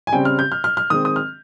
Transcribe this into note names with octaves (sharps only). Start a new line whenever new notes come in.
G#5
C#3 G3 C4 G5
F6
G6
F6
F6
F6
D#3 G#3 C4 D#6
D#6
F6